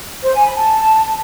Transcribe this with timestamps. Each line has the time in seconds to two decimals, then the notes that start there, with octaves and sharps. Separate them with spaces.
0.24 C5
0.34 G#5
0.45 B5
0.56 A5